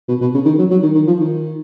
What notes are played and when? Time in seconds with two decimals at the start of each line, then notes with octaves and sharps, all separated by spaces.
0.08 B2
0.21 B2
0.34 C#3
0.45 D#3
0.58 F#3
0.71 F#3
0.83 D#3
0.95 D#3
1.07 F3
1.20 D#3